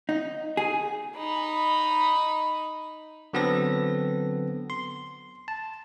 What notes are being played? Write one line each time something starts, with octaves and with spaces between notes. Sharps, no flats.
D#4
G#4
D#4 B5
D3 F#3 B3 C4 A4 A#6
C6
A5